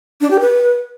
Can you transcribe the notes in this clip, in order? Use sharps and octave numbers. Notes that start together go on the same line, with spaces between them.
D4
G4
B4